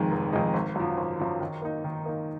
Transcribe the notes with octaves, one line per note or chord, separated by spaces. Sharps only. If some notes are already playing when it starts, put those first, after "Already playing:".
Already playing: F1 F2 D#3 G#3 D#4
F1
F2 D#3 G#3 D#4
G#1
F#2 F3
G#1
F#2 F3
D#3
A#3 D#4
D#3
A#3 D#4